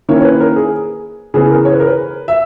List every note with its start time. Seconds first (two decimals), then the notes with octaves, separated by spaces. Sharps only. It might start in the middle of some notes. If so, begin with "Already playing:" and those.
0.09 D#3 A#3 C#4 E4 C#5
0.20 C#5
0.24 B4
0.40 A#4
0.56 G#4
1.34 C#3 E3 B3 G#4
1.50 A#4
1.65 C#5
1.73 B4
1.80 A#4
1.87 B4
2.28 E5